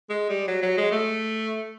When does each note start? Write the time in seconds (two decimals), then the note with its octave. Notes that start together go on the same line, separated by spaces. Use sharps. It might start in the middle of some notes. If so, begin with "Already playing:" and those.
0.10 G#3
0.29 G3
0.48 F#3
0.63 F#3
0.77 G#3
0.92 A3